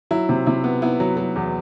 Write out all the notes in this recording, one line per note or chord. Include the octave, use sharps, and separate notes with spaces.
F#3 E4
C3
C3 E4
B3
B3 E4
F#3
F#3
E2